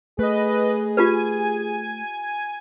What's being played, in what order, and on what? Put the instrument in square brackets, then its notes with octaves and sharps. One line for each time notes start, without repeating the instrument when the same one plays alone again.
[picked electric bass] A3 [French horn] G#4 [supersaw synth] B4 D#5
[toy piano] F4 G4 B4 [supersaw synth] G#5